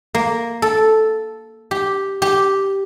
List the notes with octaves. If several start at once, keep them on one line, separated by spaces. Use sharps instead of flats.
A#3
A4
G4
G4